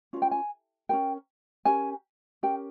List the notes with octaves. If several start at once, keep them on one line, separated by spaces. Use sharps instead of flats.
C#4 F4 A#4
G5
G#5
C#4 F4 A#4 G5
C#4 G4 A#4 G#5
C#4 G4 A#4 G5